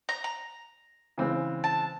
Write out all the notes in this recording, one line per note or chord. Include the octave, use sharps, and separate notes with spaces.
A#5
A#5
C#3 E3 G#3 C4
A5